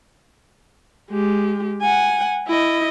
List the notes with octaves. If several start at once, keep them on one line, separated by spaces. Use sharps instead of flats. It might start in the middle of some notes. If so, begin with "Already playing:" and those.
G#3 G4
F#5 G#5
E4 D#5